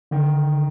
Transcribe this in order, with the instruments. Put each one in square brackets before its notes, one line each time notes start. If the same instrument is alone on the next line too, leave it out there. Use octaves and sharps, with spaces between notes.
[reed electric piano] D3 [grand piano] D#3